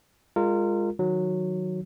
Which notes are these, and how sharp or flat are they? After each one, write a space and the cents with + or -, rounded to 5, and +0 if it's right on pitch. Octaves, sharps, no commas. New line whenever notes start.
G#3 -25 F4 +0 A#4 -25
D#3 +0 F#3 -10